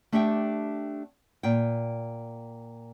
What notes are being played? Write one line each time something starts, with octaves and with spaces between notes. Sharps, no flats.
A3 D4 G4 E5 F#5 G5
A#2 G5